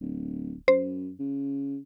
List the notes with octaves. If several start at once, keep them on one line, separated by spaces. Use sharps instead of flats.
D1
F#2 C5
C#3